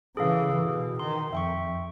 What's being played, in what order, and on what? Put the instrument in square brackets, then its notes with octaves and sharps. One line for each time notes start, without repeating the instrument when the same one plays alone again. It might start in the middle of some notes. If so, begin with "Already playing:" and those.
[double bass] C#3 E3 [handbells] G#4 A4 F5
[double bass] B2 [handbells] G#4
[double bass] D#3 [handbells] C6
[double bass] F2 [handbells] E5 G5 C#6